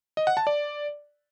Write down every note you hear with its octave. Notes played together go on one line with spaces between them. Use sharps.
D#5
F#5
A5
D5